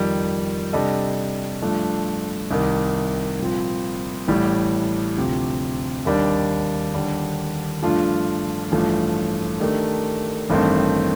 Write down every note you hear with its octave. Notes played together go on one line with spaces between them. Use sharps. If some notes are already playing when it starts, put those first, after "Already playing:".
Already playing: F2 D#3 G3
C3 G3 D4 A4 D#5
G2 F3 A3 D4
C2 C3 D#3
C2 A#2 F3 C4
A1 A2 G3
D2 C3 F3 C4 G4
D#2 D#3 G3 D4
D#2 D3 G3 D4
G2 F3 A3 D4 F4
A1 G2 F3 A3
D#3 A3 D4 G4 A#4
A1 G2 D#3 A3 C4